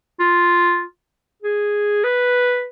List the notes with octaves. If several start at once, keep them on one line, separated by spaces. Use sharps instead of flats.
F4
G#4
B4